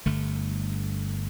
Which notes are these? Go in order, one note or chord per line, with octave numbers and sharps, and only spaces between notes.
G1 G2 D3 A3